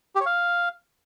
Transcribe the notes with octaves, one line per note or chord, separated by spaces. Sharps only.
G4
C#5
F5